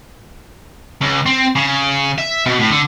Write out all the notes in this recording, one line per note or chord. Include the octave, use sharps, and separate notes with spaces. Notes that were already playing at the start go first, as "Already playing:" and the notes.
C#2
C4
C#3
E5
B2
A2
D3